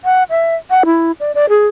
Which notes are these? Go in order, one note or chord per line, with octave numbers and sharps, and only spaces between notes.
F#5
E5
F#5
E4
D5
D5
G#4